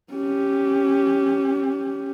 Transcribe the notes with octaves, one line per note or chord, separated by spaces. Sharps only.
C#4 G4